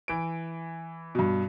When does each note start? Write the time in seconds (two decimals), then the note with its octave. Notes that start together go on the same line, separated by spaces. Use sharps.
0.08 E3 D7
1.15 G2 B2